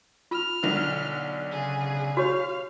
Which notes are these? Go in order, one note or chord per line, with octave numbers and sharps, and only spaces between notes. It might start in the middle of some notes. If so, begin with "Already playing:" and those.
F4 F6
B1 D3
C#3 G#4
F#4 G4 C#5 F5